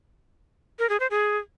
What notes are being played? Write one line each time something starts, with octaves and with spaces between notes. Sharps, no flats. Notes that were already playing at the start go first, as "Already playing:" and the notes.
A#4
G#4
C5
G#4